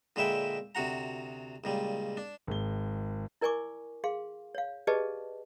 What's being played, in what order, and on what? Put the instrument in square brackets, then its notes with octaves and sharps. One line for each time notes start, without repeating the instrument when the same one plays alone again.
[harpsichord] A#2 D3 G#3 B4 E5 G5
D2 C3 F#4 F#5 A#5
C#2 A#2 G3
D4
[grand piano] G#1 G#3 G7
[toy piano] E4 A#4 D5 G#5 C#6 D6
G#4 F5 C6
C#5 F5
G4 G#4 B4 D5 D#5 A5